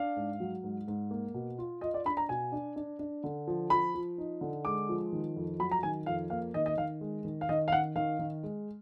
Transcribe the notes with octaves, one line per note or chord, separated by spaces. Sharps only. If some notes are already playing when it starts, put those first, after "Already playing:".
Already playing: D4 F5
G#2
F#3
G#2
G#2
A#3
B2
F4
F4 D#5
D5
D4 B5
A#5
B2 G#5
D4
D4
D4
D3
F3
F3 B5
F3
D#4
D3
G#3 D6
F3
D#3
F2
F#3 B5
A#5
D#3 G#5
F2 F5
A#3 F5
D#3 D#5
D#5
D#3 F5
G#3
D#3
F5
D#3 D#5
F5
D#3 F#5
D#3 F5
D#3
G#3